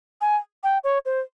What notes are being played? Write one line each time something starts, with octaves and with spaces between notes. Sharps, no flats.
G#5
G5
C#5
C5